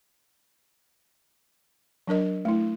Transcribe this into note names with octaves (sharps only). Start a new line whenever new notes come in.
F#3 D4 A#4 D#5
A3 E4